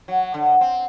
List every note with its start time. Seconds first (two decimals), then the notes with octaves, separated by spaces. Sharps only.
0.08 F#3
0.34 D3
0.61 C4